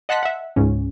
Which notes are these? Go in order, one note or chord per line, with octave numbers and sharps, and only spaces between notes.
D#5 F#5 A5 C6 F#6 B6
E5 F#5
C#2 G#2 C#4